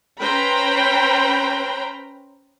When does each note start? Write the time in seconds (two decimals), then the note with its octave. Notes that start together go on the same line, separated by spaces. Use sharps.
0.20 C#4 B4 C5 G5 A#5 B5